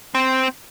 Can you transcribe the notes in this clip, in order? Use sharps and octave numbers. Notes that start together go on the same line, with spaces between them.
C4